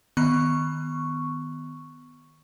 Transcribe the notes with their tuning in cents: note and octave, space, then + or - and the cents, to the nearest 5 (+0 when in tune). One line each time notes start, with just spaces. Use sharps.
D#3 +0 B3 +10 C#6 +0